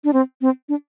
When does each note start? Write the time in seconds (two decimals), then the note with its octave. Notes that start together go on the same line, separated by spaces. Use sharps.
0.04 D4
0.13 C4
0.41 C4
0.69 D4